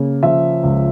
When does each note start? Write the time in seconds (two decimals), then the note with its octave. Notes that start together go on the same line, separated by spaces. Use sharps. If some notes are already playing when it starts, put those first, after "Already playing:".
Already playing: C#3 A#3
0.23 F3 E5
0.63 C#2